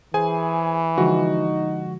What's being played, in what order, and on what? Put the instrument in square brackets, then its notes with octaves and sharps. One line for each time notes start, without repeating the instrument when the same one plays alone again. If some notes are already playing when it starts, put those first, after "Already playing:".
[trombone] E3 [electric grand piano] G#4 C5 G#5
[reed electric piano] D3 F3 G#3 [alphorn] D#4 [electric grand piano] F#4